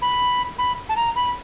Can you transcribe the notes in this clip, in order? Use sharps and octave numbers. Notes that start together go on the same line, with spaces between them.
B5
B5
A5
A#5
B5